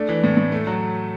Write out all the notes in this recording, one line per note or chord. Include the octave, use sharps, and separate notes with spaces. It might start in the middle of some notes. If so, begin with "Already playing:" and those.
Already playing: A3 D4
E3
A2
A2
A3
F#3